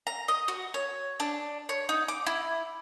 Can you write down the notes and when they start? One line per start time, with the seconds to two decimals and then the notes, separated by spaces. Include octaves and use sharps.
0.07 A#5
0.28 D#5
0.48 F#4
0.74 C#5
1.20 D4
1.69 C#5
1.89 D#4
2.08 D6
2.26 E4